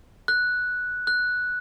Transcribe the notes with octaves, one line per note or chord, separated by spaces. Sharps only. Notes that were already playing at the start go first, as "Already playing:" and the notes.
F#6
F#6